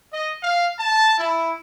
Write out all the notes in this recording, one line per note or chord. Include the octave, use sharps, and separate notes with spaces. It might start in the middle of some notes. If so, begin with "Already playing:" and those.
D#5
F5
A5
E4